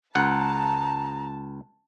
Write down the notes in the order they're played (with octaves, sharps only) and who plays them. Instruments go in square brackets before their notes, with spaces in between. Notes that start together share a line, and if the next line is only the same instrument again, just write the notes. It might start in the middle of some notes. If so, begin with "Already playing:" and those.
[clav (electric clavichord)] C#2 F#5 [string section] A5 [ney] A#5